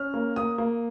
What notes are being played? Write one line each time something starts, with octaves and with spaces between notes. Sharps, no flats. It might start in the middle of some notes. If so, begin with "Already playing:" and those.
Already playing: C#4 F6
A#3
A#3 D#6
A#3